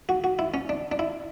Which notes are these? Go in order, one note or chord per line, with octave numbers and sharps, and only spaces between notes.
F#4
F#4
E4
C#4
D4
D4
E4